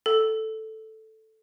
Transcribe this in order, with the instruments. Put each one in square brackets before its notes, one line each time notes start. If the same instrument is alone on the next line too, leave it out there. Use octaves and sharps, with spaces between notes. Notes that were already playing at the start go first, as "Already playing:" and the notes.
[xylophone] A4